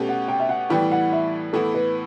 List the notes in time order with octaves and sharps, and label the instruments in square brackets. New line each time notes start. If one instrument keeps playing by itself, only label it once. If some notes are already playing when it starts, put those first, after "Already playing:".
Already playing: [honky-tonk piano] B2 A3 C#4 G4
[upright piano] F#5
G5
E5
F#5
[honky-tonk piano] A2 E3 G3 B3 [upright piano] G5
[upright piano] F#5
E5
[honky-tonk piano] A2 E3 B3 E4 [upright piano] A4
[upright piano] B4